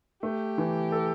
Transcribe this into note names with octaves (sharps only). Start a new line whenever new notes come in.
A3 G4
E3
A4